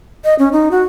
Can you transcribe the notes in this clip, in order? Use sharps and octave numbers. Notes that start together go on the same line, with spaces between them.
D#5
C#4
D#4
F#4